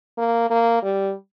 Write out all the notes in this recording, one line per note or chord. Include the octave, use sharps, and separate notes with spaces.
A#3
A#3
G3